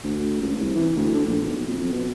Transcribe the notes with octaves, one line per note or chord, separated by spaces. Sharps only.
D2
C#2
C2
E3
D2
D3
A#1
B1
F2
F2
B2